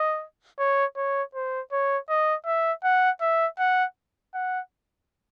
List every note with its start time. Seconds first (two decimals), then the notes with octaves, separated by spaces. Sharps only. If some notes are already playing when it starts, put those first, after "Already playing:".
Already playing: D#5
0.59 C#5
0.97 C#5
1.35 C5
1.72 C#5
2.09 D#5
2.46 E5
2.84 F#5
3.21 E5
3.59 F#5
4.34 F#5